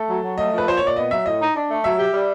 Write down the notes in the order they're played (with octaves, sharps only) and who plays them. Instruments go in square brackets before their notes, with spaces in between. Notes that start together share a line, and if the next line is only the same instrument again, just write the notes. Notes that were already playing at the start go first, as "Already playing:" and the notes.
Already playing: [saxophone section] A3 [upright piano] A4
[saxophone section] F#3
F#3
[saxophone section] A3 [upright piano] D#5
[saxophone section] F3
[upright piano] B4
[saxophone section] A#2 [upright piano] C5
[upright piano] C#5
[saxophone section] A#2 [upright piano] D5
[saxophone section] B3 [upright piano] D#5
[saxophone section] F#3 [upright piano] E5
[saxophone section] A2 [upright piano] D#5
[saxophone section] D#4
D4
A3
[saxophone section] F#3 [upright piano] E5
[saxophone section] G4
G3